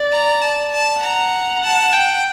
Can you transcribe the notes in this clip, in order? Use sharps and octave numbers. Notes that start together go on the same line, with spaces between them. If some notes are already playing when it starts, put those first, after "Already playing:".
Already playing: D5
A#5
A5
A5
F#5 A#5
A5
G5